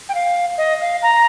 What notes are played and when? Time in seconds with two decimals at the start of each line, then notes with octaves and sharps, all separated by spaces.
0.09 G5
0.14 F5
0.58 D#5
0.81 F5
1.02 A#5